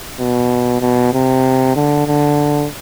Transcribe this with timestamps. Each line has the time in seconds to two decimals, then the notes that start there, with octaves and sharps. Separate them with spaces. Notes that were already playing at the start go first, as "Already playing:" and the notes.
0.20 B2
0.81 B2
1.13 C3
1.76 D3
2.07 D3